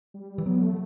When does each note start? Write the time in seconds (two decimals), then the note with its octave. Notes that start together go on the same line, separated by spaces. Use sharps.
0.14 G3
0.38 E3
0.46 F#3 B3
0.62 A3